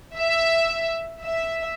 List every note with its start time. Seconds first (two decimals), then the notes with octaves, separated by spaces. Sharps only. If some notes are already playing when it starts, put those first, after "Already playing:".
0.16 E5
1.23 E5